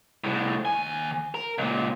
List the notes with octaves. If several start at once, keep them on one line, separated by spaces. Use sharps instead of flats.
C2 A2
D#2 G#5
A#4
C#2 A#2